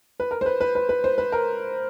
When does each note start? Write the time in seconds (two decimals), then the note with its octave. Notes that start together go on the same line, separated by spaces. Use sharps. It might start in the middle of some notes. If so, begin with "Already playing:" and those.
0.20 B4
0.31 A#4
0.41 C5
0.46 B4
0.60 B4
0.75 B4
0.89 B4
1.04 C5
1.18 B4
1.32 A#4